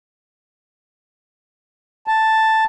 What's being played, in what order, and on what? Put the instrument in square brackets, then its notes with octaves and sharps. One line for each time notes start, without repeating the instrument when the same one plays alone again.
[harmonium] A5